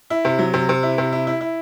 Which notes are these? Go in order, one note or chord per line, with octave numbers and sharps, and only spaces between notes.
E4
C3
F#3
C3
C3
E4
C3
E4
E4
E4